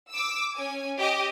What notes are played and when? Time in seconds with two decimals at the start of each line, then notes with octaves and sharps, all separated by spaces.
0.12 D6 E6
0.55 C#4 G#5
0.97 G4 D#5